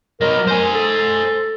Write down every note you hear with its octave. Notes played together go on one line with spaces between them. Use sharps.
F#3 A#4 D#5
C5 G#5
A4